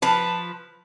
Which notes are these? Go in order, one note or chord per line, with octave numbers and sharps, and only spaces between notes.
F3 B4 A5